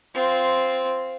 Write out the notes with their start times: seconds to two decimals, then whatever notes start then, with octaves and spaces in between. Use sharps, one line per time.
0.14 C4 F4